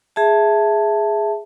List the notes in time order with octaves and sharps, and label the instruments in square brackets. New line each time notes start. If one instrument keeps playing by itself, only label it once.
[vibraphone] G#4 E5 A5